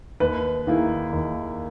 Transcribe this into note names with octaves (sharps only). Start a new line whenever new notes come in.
D#2 B4
D#3 A#3 E4 G#4
D#2